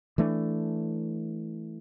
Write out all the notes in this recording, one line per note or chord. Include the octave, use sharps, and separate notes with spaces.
E3 A3 D4